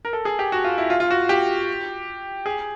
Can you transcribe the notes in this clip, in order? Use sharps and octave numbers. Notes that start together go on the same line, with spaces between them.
A#4
A4
G#4
G4
F#4
F4
E4
F4
F4
F#4
G4
G#4